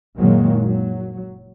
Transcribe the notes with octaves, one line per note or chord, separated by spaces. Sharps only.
F#1 A#2 D#3 F#3 G#3 A#3
F#3